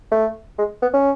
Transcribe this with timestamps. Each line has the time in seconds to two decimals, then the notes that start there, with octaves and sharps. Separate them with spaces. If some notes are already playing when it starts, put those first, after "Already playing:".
0.12 A3
0.59 G#3
0.82 B3
0.94 C#4